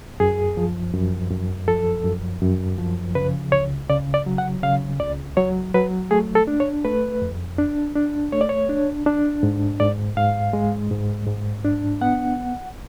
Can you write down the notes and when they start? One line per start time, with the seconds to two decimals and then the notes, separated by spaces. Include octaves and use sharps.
0.20 F#2 G#4
0.57 F3
0.94 F#2
1.31 F#2
1.68 F3 A4
2.04 F#2
2.42 F#2
2.78 F3
3.15 C#3 B4
3.52 C#2 C#5
3.89 C#3 D5
4.14 D5
4.26 F#3
4.38 F#5
4.63 C#3 F5
5.00 C#2 D5
5.37 F#3 C#5
5.74 F#3 B4
6.11 A3 G#4
6.35 A4
6.47 D4
6.60 C#5
6.85 A3 B4
7.22 F2
7.58 D4
7.95 D4
8.32 A3 C#5
8.41 D5
8.49 C#5
8.69 D4
9.06 D4
9.43 G#2
9.80 G#2 D5
10.17 G#2 F5
10.53 G#3
10.90 G#2
11.27 G#2
11.65 D4
12.01 B3 F#5